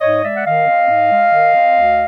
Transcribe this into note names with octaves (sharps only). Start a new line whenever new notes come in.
G#2 C#5 D#5
G#3 D5 E5
F#5
D#3 D#5 F5
C4
G#2
G#3
D#3
C4
D2